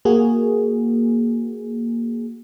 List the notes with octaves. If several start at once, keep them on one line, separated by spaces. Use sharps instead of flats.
A#3 F#4 G#4